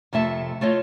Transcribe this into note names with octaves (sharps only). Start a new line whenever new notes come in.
F2 C3 A3 E5 A5
A3 F4 C#5 D#5